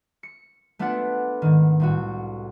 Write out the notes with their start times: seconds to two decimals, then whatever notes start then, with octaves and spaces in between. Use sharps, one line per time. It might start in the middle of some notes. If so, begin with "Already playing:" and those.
0.23 C#7
0.79 A3 B3 D4 F4 A4 F#5
1.42 G#2 D#3
1.80 C2 A2 F#4